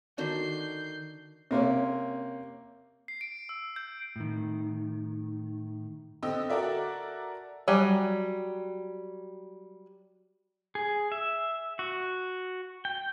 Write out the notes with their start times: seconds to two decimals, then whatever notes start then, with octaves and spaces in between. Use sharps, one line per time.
0.18 D3 D#3 F#4 G6 C7
1.51 C3 A#3 C4 C#4
3.08 C7
3.21 D7
3.49 E6
3.76 G6
4.16 A2 D#3
6.23 D3 C4 D#5 E6
6.49 F#4 A4 A#4 D5 E5
7.68 F#3 G3 G#5
10.75 G#4
11.12 E5
11.79 F#4
12.85 G5